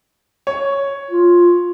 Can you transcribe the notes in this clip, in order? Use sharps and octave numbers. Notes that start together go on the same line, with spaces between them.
C#5
F4